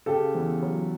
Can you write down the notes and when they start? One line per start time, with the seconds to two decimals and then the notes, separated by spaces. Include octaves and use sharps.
0.06 C#3 G4 A4
0.35 E2
0.62 F#3